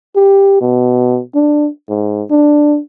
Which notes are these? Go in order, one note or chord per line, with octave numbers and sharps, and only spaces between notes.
G4
B2
D4
G#2
D4